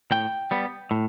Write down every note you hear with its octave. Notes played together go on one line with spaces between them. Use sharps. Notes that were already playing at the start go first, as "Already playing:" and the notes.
A2 G5
G3 B3
A2